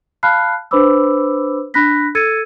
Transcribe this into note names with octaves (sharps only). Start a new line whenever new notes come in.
F5 A5 B5 F6 F#6 C7
D4 B4 C5 B5 D6 E6
D4 B5 F#6 A#6 B6
A4 E6 G#6 A6 C#7 D#7